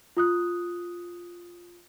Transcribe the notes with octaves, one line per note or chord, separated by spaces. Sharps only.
F4 D#6 F#6